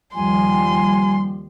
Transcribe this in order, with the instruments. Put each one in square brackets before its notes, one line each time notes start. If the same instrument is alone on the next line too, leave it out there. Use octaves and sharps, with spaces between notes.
[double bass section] D#2 F3 G3 [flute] G#5 [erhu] C6